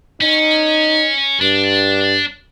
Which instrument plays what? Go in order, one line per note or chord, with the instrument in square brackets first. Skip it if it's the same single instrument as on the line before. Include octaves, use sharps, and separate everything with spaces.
[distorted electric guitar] C#4 [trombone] D#4
[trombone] G2 [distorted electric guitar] D4